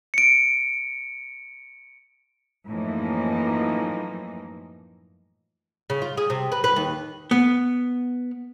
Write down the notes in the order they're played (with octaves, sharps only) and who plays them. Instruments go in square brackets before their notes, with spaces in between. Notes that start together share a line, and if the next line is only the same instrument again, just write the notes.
[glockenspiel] C#7 D7
[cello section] F#2 A2 E3 F3 A#3 D#4
[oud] C#3
F4
G#4
C3
B4
B4
D#2
[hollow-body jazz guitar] B3